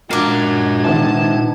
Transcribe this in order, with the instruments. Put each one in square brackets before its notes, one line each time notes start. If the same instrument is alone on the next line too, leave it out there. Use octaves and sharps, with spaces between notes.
[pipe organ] A#2 G#3 G#6 [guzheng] D4 F5 [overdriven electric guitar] F#4 A#4
[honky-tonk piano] C3 D#3 B3 [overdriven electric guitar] A5